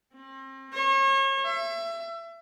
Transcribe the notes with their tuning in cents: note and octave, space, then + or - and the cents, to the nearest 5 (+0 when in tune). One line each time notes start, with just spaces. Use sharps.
C4 +40
C#5 -35
E5 +30